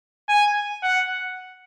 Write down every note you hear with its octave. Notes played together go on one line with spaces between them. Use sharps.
G#5
F#5